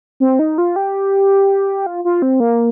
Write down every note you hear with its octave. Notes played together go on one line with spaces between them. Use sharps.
C4
D#4
F4
G4
F4
F4
C4
A#3